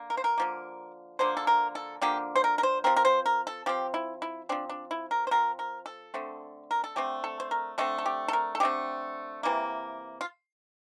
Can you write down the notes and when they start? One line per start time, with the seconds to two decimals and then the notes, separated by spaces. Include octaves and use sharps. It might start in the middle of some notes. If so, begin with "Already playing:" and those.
Already playing: D3 A#3
0.10 A#4
0.17 C5
0.24 A#4
0.38 D3 F3 A#3
1.19 D3 F3 A#3 C5
1.37 A4
1.47 A#4
1.75 A4
2.01 D3 F3 A#3 G4
2.36 C5
2.44 A#4
2.58 A#4
2.63 C5
2.84 F3 C4 A#4
2.96 A#4
3.05 C5
3.26 A#4
3.47 A4
3.66 F3 C4 G4
3.94 E4
4.22 E4
4.49 F3 C4 D4
4.69 D4
4.91 E4
5.11 A#4
5.27 C5
5.31 F3 C4 A#4
5.59 A#4
5.86 A4
6.14 D3 A3 C4
6.71 A#4
6.84 A4
6.96 D3 A3 C4 G4
7.24 A4
7.40 C5
7.51 A#4
7.78 D3 A3 C4 A4
7.98 A4
8.06 G4
8.28 A4
8.33 A#4
8.55 A4
8.60 D3 A3 C4 G4
9.43 C3 E3 A#3
10.21 F4